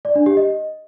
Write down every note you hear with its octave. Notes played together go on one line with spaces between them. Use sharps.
D5
D4
G4
D#5